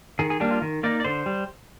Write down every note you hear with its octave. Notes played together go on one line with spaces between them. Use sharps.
D#3 G#4
G#4
G3 A#3 D4 G4
F4
D#3
A#3 D#4 D5
D5
D3 C5
G3